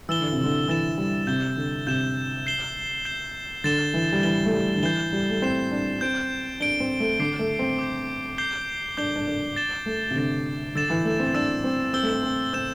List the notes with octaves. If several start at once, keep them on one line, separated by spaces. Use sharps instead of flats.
E3 E6 A6 E7 G7
D3
C3
D3
E3 E6 A6 E7 G7
G3
C3 G6 E7 G7
D3
C3 G6 E7 G7
G6 C7 E7 G7
G6 C7 E7 G7
D3 A6 E7 G7
E3
G3
E3 A6 E7 G7
A3
G3
D3
E3 G6 C7 E7 G7
G3
A3
C4 G6 C7 E7 G7
D4
C4 G6 D7 G7
D4 G6 D7 G7
C4
A3
D3 D6 G6 C7
A3
C4
D6 G6 C7
D6 G6 C7 G7
D4 D6 G6 C7 G7
D4
D4
A6 E7 G7
A3
C3
D3 A6 E7 G7
D3 E6 A6 E7
E3
A3
C4
D4 E6 A6 E7
C4
C4 E6 G6 E7 G7
A3
C4
C4
C4 E6 G6 E7 G7